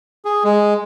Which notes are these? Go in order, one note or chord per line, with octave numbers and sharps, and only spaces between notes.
G#4
G#3